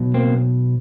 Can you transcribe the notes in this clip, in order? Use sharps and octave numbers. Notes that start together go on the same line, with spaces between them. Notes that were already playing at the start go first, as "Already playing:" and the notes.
Already playing: B1 B2
A#3 C4